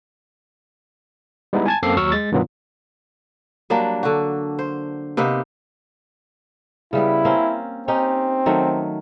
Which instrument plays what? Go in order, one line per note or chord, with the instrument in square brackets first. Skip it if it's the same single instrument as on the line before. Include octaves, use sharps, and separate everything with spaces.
[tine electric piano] G3 G#3 B3 D#4 E4
G#5 A5 G#6
F#2 A#3 C4 A4 D6 C7
D#2 F#3 C#6 E6 F6
G#3 A6
G2 B2 D#3 F#3 B3 F4
[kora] F#3 G3 A#3 D4
D3 F#4
C5
C3 A#3 B3 D#4
[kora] C#3 G3 B3 [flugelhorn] E4
[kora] A#3 C4 C#4
[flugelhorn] C4 [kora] C#4 D#4 G4
[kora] D#3 F#3 A3